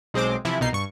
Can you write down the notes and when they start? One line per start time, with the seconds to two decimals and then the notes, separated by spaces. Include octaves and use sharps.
0.14 B1 G#3 C4 C5 D6
0.45 C3 E3 F3 E4
0.60 C2 B2 D#4 C7
0.73 G2 C#6